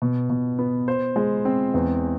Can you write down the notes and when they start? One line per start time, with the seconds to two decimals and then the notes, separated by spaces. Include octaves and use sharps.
0.02 B2
0.30 B2
0.59 B3
0.88 C5
1.16 G#3
1.45 C4
1.74 E2